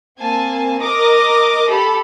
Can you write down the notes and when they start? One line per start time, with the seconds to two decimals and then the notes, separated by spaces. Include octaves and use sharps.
0.19 A#3 C4 G#5 A5
0.81 A#4 D#5 D6 D#6 A#6
1.68 G4 A4 B5